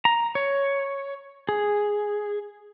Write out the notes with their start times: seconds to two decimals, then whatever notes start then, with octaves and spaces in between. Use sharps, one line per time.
0.05 A#5
0.35 C#5
1.49 G#4